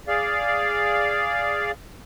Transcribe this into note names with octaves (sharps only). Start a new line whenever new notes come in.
G#4 D5 F5